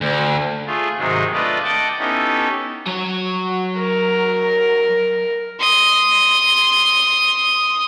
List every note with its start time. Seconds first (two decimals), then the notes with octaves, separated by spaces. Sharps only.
0.01 D2
0.66 A3 F4 G#4
0.97 G#2 C3 D#3 F#3 G#3
1.33 A3 D4 F4 B4 D5 D#5
1.64 D5 D#5 F#5 G5 A5 D6
1.99 B3 C#4 D#4 E4 G4 A4
2.86 F#3 C#5
3.79 A#4
5.60 C6 D#6